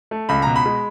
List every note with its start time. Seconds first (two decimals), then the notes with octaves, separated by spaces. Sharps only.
0.11 A3
0.29 C#2 B5
0.42 B2 A#5
0.56 B5
0.66 G#3